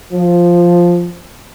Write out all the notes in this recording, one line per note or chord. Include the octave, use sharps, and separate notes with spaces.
F3